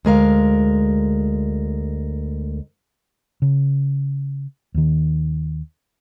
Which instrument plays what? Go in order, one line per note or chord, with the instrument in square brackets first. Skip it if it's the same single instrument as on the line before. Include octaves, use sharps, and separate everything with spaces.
[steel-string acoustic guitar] D2 G#3 A#4 F5
[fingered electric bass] C#3
D#2 D#3